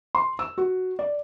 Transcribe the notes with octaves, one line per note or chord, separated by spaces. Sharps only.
C6
E6
F#4
D5